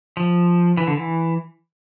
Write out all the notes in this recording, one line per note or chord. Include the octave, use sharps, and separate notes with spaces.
F3
E3
D3
E3